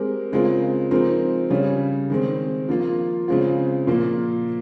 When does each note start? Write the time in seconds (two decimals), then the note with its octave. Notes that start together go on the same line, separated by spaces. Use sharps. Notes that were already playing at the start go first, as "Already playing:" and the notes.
Already playing: G#3 C4 G4 A#4
0.32 C#3 G#3 C4 F4 A#4
0.91 F3 G#3 C4 D#4 A#4
1.50 C#3 G3 C#4 G#4
2.10 D#3 G#3 C4
2.69 F3 A#3 F4
3.28 C#3 G#3 C4 F4
3.87 A#2 F3 A#3